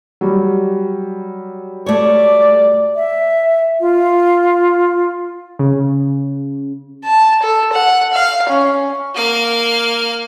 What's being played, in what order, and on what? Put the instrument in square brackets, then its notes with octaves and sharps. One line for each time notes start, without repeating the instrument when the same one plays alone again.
[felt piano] F#3 G3
[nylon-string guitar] A3 C#5 [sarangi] D5
[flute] E5
F4
[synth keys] C#3
[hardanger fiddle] A5
A4
F#5
F5
C#4
[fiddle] A#3 F5